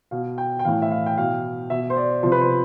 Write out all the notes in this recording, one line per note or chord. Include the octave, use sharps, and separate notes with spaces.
B2 F5
G5
G5
A2 E3 F5
E5
F5
G5
B2 F5
B2 E5
C5
D5
C3 F3 C5
B4
C5